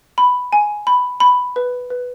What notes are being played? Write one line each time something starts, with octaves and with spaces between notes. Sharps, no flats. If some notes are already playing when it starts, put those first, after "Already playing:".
B5
G#5
B5
B5
B4
B4